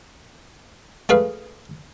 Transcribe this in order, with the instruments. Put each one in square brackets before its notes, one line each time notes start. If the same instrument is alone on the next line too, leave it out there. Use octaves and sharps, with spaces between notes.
[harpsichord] A3 G#4 B4 F5